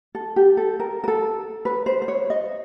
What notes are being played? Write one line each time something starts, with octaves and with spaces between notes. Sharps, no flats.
A4
G4
A4
A#4
A#4
A4
B4
C5
C5
C#5
D#5